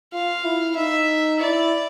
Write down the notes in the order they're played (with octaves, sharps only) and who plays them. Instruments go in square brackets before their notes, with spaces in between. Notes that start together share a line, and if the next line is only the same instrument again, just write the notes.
[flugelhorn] F4 [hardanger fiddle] F5
[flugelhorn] E4
[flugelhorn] D#4 [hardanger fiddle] E5
[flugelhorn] E4 [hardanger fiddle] D5